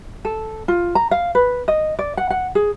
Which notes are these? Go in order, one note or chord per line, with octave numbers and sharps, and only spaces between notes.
A4
F4
A#5
F5
B4
D#5
D5
F#5
F#5
G#4